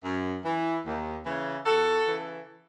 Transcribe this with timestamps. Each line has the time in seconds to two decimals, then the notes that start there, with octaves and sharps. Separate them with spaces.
0.03 F#2
0.45 E3
0.85 D#2
1.24 C#3 E3
1.66 E2 F#4 A4
2.06 C#3 E3